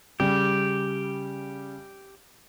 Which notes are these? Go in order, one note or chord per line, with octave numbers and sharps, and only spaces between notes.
C#3 G3 G4